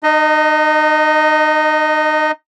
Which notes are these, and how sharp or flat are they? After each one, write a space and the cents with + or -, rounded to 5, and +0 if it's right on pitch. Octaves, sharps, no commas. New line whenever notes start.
D#4 -35 D#5 +0